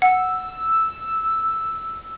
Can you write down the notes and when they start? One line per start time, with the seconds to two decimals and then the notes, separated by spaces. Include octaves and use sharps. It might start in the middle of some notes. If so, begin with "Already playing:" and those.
0.02 F#5 E6